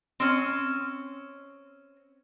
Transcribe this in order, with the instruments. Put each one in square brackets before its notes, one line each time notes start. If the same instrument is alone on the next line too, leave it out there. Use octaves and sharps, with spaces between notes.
[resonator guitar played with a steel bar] C4 C#4